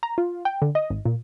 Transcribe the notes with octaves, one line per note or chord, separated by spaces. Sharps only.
A#5
F4
G5
D3
D#5
G#1
A#2